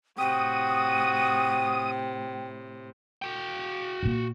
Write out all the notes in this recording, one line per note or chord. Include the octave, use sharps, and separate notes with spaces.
A2 C3 F#4 G5 D#6
F#4 G5
A#2 A#3